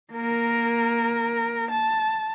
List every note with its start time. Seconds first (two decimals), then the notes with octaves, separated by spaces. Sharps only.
0.12 A#3 A#4
1.71 A5